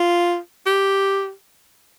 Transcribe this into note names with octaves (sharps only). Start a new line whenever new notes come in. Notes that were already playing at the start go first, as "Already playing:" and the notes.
Already playing: F4
G4